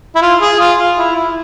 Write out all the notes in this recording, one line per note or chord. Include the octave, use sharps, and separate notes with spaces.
E4
F4
G#4
F4
F4
E4
E4